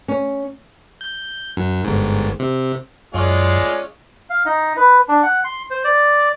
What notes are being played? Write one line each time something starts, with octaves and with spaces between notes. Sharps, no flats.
C#4
G6
F#2
G1 G#2
C3
F#2 G#3 C#4 F4 D5
F5
D#4
B4
D4
F#5
C6
C5
D5